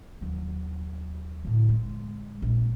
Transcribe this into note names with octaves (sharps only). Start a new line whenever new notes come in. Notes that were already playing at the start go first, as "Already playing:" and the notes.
D#2 F#3
A2 D3
G#3
A#1